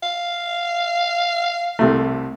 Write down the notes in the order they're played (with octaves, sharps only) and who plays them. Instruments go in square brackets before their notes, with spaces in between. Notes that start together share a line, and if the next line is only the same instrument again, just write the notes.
[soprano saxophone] F5
[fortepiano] C2 C3 A3